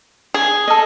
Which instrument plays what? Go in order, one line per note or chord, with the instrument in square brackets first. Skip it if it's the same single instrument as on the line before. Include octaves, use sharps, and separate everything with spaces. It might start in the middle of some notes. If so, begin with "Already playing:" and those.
[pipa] G#4
[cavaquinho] A4 D#5